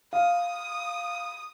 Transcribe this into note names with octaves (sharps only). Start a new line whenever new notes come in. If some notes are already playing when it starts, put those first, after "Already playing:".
F5 D#6